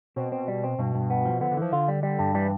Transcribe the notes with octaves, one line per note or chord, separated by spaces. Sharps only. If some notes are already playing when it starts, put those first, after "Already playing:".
B2 C4
C4
G3
C4
G2 B2
G2
B3
F3
D3 B3
D3
E3 F3
D3 F4
G3
G3
G2
E3 G3